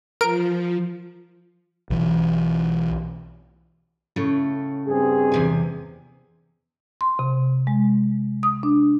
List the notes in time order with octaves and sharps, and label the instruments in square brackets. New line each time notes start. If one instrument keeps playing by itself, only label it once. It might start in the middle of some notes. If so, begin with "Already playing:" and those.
[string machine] F3 [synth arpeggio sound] A#4 D7
[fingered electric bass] B1 E3
[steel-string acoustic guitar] A2 C#3 A3
[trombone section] G2 C4 G#4
[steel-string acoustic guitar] E2 C3 G#5
[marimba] C6
C3
G#3
D#6
D4